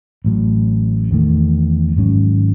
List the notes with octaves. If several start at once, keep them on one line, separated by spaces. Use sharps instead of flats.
A1 A2 F#3
E2 D#3 A3
G#1 G#2 F#3 C#4